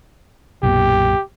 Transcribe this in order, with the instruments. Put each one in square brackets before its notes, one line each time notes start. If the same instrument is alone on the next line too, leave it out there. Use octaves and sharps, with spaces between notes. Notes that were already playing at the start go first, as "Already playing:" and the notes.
[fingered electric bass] B1 F#2 A#2 [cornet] G4